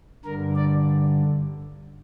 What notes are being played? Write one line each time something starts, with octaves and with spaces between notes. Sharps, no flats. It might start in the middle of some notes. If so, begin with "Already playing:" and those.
G2 D3 A#4
D5